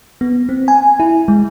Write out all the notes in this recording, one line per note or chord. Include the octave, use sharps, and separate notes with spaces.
B3
C4
G#5
E4
G#3